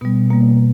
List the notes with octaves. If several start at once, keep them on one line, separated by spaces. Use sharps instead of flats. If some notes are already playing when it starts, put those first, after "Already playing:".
B2 G3 B3
B2 G3 A#3